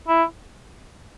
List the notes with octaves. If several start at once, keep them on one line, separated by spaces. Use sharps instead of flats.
E4